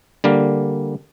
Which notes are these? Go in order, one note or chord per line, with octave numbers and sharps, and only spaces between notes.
D3 G3 A#3 A#4